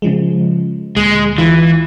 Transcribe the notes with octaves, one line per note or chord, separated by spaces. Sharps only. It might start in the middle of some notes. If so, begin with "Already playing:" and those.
C#3 F3 G#3
D2 A#2 G#3
E3 F4